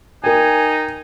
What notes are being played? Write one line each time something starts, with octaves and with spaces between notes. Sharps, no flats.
D#4 A#4 G5 G#5